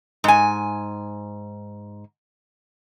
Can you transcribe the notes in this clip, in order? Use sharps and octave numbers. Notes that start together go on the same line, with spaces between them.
G#2 G#5